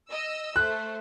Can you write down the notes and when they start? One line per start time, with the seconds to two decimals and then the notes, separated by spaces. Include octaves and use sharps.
0.11 D#5 E6
0.56 A3 C5 F#6